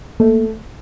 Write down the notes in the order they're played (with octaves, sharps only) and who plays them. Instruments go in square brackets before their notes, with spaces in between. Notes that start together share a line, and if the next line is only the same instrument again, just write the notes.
[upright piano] A3 [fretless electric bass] A#3